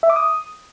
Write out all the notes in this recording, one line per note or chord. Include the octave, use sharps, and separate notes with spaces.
E5
D6
D#6